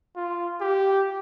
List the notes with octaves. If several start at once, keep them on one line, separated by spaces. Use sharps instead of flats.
F4
G4